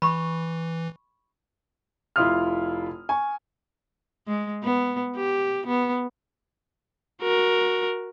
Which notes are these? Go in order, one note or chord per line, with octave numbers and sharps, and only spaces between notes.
E3 B5 C#6
F1 E4 F4 C6 D#6 F6
G#5 C#6
G#3
B3
G4
B3
F#4 A#4